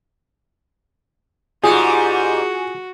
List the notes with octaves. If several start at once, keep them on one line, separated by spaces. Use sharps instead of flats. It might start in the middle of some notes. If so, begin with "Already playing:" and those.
G#2 G3 F4 F#4 G#4 G#5 D#6